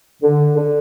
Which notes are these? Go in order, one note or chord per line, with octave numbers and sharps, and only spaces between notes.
D3
D3